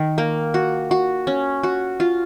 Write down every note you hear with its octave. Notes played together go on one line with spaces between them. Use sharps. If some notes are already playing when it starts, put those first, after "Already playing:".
Already playing: D#3
A#3
F#4
F#4
C#4
F#4
F4